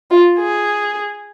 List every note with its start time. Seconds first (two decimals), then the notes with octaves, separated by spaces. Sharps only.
0.11 F4
0.39 G#4